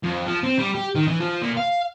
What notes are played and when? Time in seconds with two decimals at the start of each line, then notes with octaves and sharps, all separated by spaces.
0.03 F2
0.26 F3
0.43 C4
0.59 G3
0.75 G4
0.95 D#3
1.08 E3
1.20 F3
1.42 A#2
1.57 F5